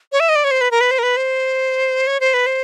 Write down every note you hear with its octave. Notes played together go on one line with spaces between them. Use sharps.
C#5
E5
D#5
D5
C#5
C5
B4
A#4
B4
C5
A#4
B4
C5
C#5
C5
B4
C5